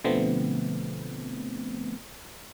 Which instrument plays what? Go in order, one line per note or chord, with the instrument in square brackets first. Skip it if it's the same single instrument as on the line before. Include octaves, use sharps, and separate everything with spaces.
[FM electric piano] B2 D3 F3 A3 B3 C4